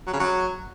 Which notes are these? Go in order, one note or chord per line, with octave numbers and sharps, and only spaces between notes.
F#3
C#3
F#3